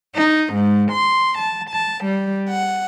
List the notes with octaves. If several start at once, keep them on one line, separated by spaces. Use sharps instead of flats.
D#4
G#2
C6
A5
A5
G3
F#5